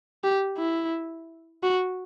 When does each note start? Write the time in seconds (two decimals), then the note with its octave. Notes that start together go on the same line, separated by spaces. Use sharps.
0.24 G4
0.58 E4
1.63 F#4